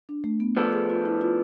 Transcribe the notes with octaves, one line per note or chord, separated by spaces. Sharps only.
D4
A3
B3
F3 B3 D4 A4
G#4
F4
E4
F4